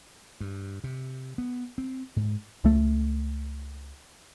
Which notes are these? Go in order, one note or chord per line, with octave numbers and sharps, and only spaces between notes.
G2
C3
B3
C4
G#2
C#2 A3